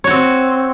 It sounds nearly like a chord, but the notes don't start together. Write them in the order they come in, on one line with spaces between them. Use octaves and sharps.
C#5 F#4 C4